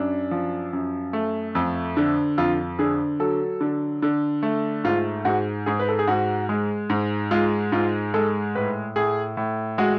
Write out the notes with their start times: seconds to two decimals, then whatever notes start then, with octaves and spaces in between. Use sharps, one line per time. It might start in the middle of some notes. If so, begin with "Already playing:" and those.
Already playing: F#2 D4
0.31 F3
0.73 F#2
1.13 A3
1.55 F2
1.97 D3
2.38 F2 F4
2.79 D3 G#4
3.20 F#3 A4
3.61 D3
4.02 D3
4.43 A3
4.84 G#2 F4
5.25 G#2 F#4
5.66 G#2 G#4
5.80 B4
5.88 A4
5.99 G#4
6.07 G#2 F#4
6.49 G#3
6.90 G#2
7.31 G#3 F4
7.72 G#2 F4
8.14 G#3 A4
8.55 A2 B4
8.96 A2 G#4
9.37 A2
9.78 G#3 F#4